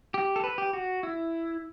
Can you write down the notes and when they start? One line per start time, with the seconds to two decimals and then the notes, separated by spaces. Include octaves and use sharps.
0.14 G4
0.36 A4
0.44 B4
0.58 G4
0.73 F#4
1.03 E4